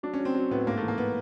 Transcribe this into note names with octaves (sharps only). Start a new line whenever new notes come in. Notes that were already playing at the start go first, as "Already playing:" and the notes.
F#3 D4
C#4
F#3
C4
F#3
A2 B3
G#2 A#3
A3
E3
A#3
B3